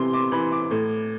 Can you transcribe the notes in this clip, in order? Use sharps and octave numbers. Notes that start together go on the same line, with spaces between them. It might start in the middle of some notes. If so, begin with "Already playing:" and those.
Already playing: C3 E3 C6
D6
E3 B5
D6
A2